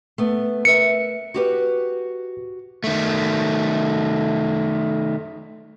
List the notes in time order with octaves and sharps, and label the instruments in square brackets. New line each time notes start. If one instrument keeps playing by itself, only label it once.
[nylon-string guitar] A3 B3
[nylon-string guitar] A#4 B4 E5 [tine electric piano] C#7
[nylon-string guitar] F#4 G4 B4
[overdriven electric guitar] D#3 A3